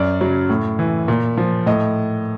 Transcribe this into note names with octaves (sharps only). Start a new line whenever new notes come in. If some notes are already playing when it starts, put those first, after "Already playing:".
Already playing: F#2 D5
C#3 F#3
A2
E3
A#2
F3
A2 D#5